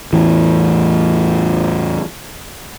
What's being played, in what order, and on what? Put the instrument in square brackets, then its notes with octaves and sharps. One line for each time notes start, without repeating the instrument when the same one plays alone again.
[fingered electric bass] E2 A2 E3